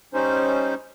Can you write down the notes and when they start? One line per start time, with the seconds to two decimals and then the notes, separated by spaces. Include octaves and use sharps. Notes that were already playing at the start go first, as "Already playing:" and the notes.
0.14 G3 C#4 D#4 C5